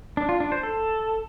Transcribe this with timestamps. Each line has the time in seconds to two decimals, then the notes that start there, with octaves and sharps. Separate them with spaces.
0.17 D4
0.29 F4
0.40 D4
0.52 C5
0.63 A4